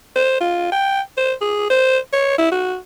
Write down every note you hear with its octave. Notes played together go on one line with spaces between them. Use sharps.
C5
F4
G5
C5
G#4
C5
C#5
E4
F#4